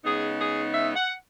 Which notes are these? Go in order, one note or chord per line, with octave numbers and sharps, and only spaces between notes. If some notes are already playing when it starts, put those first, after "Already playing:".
C#3 G#3 B3 D#4 G#4
G#4
E5
F#5